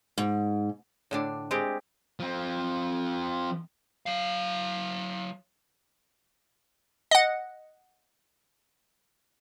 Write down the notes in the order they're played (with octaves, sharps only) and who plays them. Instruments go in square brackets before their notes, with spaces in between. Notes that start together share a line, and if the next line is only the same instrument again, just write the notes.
[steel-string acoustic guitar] G#2
[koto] A2 D3 D4
G#3 C4 G4
[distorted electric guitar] F3 C4
[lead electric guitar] F#3 F5
[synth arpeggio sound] D#5 F#5